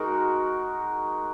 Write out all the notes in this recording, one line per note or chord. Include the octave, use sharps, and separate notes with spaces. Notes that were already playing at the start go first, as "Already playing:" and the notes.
Already playing: G#3 D#4 F#4 A#4